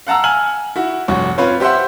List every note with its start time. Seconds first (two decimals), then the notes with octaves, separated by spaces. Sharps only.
0.07 F5 F#5 A5 A#5 E6
0.24 G#5 F6 F#7
0.76 E4 F#4
1.08 F1 G2 C#4 F#4 C#6
1.38 C4 C#4 F4 B4 C#5
1.60 G4 C5 E5 F#5 C6